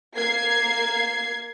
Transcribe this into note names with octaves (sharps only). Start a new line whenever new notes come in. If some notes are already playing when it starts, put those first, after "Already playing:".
A#3 G#6 C7